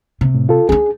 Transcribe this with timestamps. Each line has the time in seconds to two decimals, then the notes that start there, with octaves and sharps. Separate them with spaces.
0.21 C3
0.35 A2
0.49 F4 A4
0.69 C#4 D4 G#4